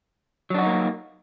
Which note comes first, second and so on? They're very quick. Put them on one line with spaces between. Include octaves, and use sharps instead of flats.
F#3 D4 F#4 D#4 A#3